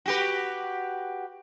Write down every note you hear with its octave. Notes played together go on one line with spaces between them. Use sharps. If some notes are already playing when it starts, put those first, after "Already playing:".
F#4 G4 B4